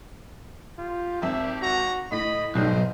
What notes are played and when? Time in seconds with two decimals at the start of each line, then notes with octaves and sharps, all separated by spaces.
0.78 F4 G4
1.22 G#1 C4 E5 A5
1.62 F#4 A#5
2.12 A2 D#5 B5
2.55 B1 G#2 G3 C5 D#5